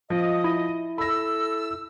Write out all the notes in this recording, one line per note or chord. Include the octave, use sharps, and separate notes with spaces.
F3 D#5
E4
A4 B5 E6 A#6